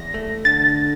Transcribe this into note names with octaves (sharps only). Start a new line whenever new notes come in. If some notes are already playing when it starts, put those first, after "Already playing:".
Already playing: E2 A#6
A3
D3 A6